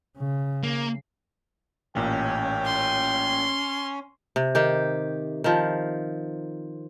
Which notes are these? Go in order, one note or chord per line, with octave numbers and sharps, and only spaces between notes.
C#3
A#3
A1 A#2 C#4 G5
C6
C3
D#3 G4
D#3 F3